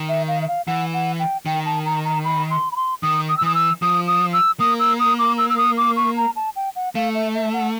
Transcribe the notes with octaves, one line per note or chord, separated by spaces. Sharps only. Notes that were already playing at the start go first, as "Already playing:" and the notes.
Already playing: D#3
E5
F5
E5
F5
E3 F#5
F#5
G5
D#3 G5
A5
A#5
A#5
B5
C6
B5
C6
D#3 D#6
D#6
E6
E3 D#6
E6
F3 D#6
D#6
E6
A#3 D#6
E6
D#6
D6
E6
E6
D#6
D6
C#6
A#5
A5
G5
F#5
A3 F5
E5
E5
F#5